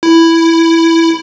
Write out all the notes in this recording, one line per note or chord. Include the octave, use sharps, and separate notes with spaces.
E4